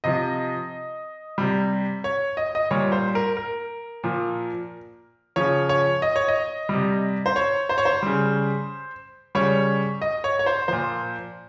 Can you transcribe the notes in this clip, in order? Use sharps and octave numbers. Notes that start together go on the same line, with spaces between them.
C3 F3 D#5
C3 G3
C#5
D#5
D#5
A#2 G3 C#5
C5
A#4
A#4
A#2 F3
C#3 F3 C#5
C#5
D#5
C#5
D#5
C3 G3
C5
C#5
C5
C#5
C5
C#3 G3
C#3 G3 C#5
D#5
C#5
C#5
C5
A#2 F3 C5